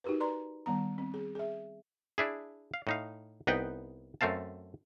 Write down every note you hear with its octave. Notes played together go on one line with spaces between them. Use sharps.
D#4 F#4 G4 A#4 B4
B4 D5 A#5 C6
D#3 G3 B3 A#5
C4
G#4
G#4 E5
D4 E4 G#4
F5
A2 D#4 F5
C2 B3 D#4 B4 G5
F#2 A3 C4 F5 A5